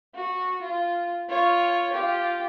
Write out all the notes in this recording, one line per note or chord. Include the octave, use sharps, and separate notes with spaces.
F#4
F4
F4 C#5
F4 G4